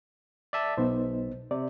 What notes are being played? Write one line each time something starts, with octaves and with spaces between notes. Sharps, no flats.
D5 E5 A5
B1 B3 D#4 C5
C3 D5